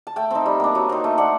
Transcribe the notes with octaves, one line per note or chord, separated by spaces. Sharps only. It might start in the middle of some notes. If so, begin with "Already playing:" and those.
A5
A3 G5
C4 D#4
G3
A#3 D4
F#3
C4 D#4
A3
D4 F#5